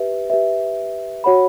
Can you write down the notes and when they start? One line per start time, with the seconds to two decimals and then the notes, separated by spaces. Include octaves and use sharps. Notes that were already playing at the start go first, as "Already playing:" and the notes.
Already playing: G4 B4 E5
0.30 G4 B4 E5
1.24 F#4 C#5 F#5 B5